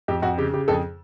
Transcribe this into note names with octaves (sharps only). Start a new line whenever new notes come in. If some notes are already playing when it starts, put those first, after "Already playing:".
F2 G4
F2 F#4
C#3 G4
C#3 G4
F2 G#4 A4